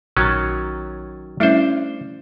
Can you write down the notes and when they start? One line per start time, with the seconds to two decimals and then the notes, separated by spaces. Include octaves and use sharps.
0.17 A#1 D#3 F#3 C#4 A6
1.40 G3 A3 C#4 D4 E4 C5 E5